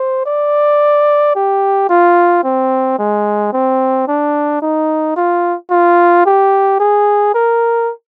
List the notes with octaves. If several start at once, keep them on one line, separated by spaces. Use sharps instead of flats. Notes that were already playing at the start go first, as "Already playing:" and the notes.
Already playing: C5
D5
G4
F4
C4
G#3
C4
D4
D#4
F4
F4
G4
G#4
A#4